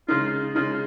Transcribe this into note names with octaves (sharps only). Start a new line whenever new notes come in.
C#3 G#3 D#4 F4
C#3 G#3 D#4 F4